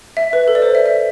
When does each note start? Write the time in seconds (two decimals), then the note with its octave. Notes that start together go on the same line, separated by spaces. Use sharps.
0.17 E5
0.33 B4
0.48 A4
0.55 D5
0.62 C5
0.75 E5
0.86 E5